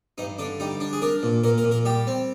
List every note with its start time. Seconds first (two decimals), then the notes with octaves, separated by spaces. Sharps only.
0.18 G2 D#4
0.38 D3 D4
0.60 G3 D#4
0.80 D4
0.93 G#4
1.02 D4 A#4
1.23 A#2
1.44 A#2 A#4
1.58 A#4
1.64 A#2
1.71 A#4
1.85 G3 G4
2.07 C4